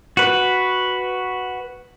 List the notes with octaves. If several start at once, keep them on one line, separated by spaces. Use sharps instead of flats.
F#4 B4